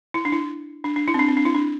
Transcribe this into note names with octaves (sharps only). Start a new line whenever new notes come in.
E4
D4
E4
D4
D4
E4
C4
D4
C4
D4
E4
D4